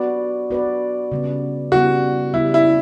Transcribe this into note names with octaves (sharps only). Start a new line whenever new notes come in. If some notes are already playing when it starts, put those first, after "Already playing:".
Already playing: B3 F#4 B4 D5
B3 F#4 B4 D5
C#3 G3 B3
C#3 G3 B3 F#4
C#3 G3 B3 E4
E4